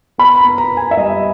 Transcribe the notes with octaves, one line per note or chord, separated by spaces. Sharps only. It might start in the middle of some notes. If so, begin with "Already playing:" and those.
B3 B5
A#5
B3
A#5
B3
G#5
E5
G3 D#5